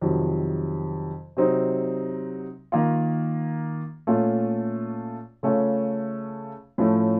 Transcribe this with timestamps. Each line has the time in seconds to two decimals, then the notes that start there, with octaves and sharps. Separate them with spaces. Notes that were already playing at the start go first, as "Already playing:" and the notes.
0.01 F2 C3 D#3 F#3
1.37 C3 F#3 C4 D#4
2.72 D#3 A#3 F4
4.07 A#2 A3 C#4 F4
5.43 C#3 A3 C#4 F4
6.78 A2 F3 A3 C#4